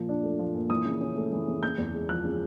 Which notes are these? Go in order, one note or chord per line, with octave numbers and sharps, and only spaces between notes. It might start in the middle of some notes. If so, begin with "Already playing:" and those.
Already playing: A#2 F3
D4
A3
F3
A#2
E3 D#6
C#3
C#4
A3
E3
C#3
C#3 G6
E2
G#3
F3 F#6
C#3